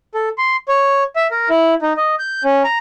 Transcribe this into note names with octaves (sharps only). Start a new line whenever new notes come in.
A4
C6
C#5
E5
A#4
E4
D#4
D#5
G6
C#4
A#5